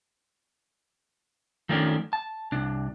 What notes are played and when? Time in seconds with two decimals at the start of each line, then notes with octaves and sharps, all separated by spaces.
1.69 D#3 F3 A3 B3 C#4 D4
2.13 A5
2.52 C2 D4